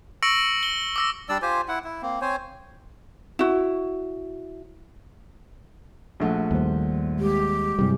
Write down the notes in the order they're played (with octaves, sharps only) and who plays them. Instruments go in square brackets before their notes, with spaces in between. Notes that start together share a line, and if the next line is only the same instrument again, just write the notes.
[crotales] C#6 E6 A#6 C#7 D7 F#7
G7
D6 E6 A#6
[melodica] G3 D4 D5 E6
F4 G4 C5 G#5
E4 F#5
E4
A#3 C4
C4 C5 C#5 G#5
[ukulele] E4 F#4
[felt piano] A#1 A3 [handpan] G#4 F#5
[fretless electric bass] D#2 [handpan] G3 C5
[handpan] G#3 [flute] G4
[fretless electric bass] G2 C3 G3 [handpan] F#3 E4 G#4